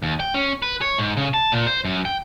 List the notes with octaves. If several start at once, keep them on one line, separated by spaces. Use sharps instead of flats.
D#2
G5
C#4
B4
C#5
G#2
C#3
A5
A#2
C5
F#2
G5